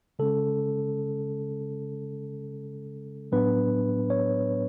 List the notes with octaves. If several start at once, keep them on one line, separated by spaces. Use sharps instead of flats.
C#3 G#3 C#4 A4
A2 F#3 B3 D4 B4
C#5